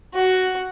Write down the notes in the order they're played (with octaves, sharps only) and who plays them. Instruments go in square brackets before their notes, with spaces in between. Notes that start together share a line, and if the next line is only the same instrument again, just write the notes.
[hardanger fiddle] F#4